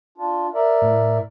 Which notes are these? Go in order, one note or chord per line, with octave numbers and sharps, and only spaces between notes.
D4 F4
A#4 D5 E5
A2